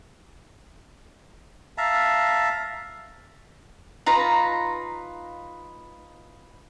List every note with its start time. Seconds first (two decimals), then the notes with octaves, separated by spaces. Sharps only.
1.78 E5 F5 A5 A#5
4.06 D#4 F4 B4 A#5